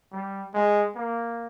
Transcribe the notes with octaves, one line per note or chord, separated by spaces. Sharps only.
G3
G#3
A#3